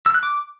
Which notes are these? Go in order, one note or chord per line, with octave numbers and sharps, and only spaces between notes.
E6
F#6
D6